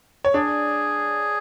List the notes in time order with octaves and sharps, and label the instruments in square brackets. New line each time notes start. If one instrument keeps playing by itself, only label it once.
[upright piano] C#5
[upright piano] D4 D5 [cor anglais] G#4